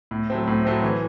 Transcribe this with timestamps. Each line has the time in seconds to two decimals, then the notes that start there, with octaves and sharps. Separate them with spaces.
0.11 A2
0.30 F#3 A3 C4
0.47 A2
0.65 F#3 A3 C4
0.83 E3